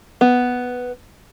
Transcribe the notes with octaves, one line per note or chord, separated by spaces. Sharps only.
B3